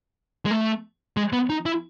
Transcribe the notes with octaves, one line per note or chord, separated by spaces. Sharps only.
G#3
A3
G#3
B3
D#4
E4